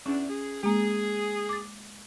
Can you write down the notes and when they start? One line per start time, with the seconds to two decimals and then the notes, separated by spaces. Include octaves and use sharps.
0.06 E2 C#4 D4
0.30 G#4
0.63 G#3 A#3 G#4
1.49 D6 A6